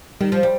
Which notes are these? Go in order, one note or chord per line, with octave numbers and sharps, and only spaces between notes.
D#3 G3
F3
G3